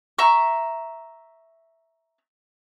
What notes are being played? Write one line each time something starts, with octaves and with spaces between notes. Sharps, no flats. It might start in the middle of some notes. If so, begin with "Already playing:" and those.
E5 A#5 C#6